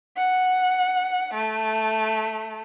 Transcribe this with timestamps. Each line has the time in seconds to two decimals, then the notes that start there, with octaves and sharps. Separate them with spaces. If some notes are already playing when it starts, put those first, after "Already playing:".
0.18 F#5
1.35 A3